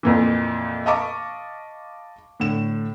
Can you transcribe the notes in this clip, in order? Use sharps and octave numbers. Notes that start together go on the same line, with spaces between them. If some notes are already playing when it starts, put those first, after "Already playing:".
F2 A#2 E3
D#5 F5 A5 B5 C#6 D6
A2 D3 E7